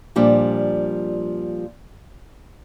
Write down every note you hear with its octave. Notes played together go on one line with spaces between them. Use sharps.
A#2 F3 G3 D4